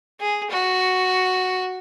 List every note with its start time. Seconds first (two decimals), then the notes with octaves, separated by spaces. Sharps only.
0.20 G#4
0.51 F#4